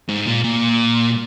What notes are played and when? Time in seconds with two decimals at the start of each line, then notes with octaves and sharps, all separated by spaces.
0.08 G#2
0.26 A#2
0.44 A#2